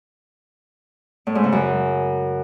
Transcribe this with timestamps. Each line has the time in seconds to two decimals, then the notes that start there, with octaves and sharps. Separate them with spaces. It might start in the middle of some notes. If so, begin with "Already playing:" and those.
1.27 A2
1.35 G#2
1.44 C#3
1.52 F#2